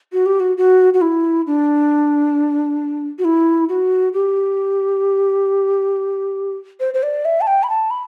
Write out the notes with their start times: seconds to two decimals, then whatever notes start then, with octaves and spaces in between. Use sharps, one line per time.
0.13 F#4
0.26 G4
0.40 F#4
0.57 F#4
0.94 F#4
1.02 E4
1.47 D4
3.19 F#4
3.25 E4
3.69 F#4
4.13 G4
6.80 C5
6.94 C5
7.03 D5
7.25 E5
7.41 A5
7.47 G5
7.63 B5
7.70 A5
7.91 B5